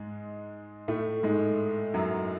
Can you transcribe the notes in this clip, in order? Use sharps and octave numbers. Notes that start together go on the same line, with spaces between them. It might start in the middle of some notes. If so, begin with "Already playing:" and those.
Already playing: G#2 G#3
A2 A3
G#2 G#3
F#2 F#3